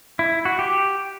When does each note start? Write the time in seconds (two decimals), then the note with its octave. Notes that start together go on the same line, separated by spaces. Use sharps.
0.19 E4
0.45 F#4
0.59 G4